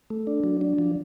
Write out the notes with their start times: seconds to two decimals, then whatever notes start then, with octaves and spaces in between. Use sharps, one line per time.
0.10 A3
0.27 D4
0.44 F#3
0.61 D4
0.79 F3